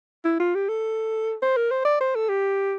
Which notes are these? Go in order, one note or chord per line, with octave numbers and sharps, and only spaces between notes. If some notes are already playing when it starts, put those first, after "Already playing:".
E4
F4
G4
A4
C5
A#4
C5
D5
C5
A4
G4